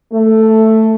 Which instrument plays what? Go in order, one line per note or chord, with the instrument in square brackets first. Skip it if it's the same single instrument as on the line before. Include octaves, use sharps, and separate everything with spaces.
[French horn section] A3